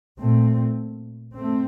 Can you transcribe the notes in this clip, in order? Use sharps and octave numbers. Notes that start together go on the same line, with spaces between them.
A#2 A3 C4
A3 C4